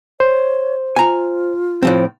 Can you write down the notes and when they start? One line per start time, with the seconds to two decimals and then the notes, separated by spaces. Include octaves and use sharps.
0.20 C5 C#5
0.96 F4 G#5 A#5
1.83 A2 F3 C4